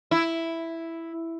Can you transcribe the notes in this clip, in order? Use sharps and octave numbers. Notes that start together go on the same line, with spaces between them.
E4